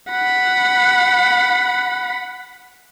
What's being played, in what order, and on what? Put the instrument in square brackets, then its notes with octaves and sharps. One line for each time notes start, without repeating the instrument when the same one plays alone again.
[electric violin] F#5 B5